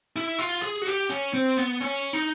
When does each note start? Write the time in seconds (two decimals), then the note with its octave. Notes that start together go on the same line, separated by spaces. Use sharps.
0.16 E4
0.39 F4
0.62 G#4
0.82 F#4
0.87 G4
1.10 C#4
1.34 C4
1.57 B3
1.80 C#4
2.13 D#4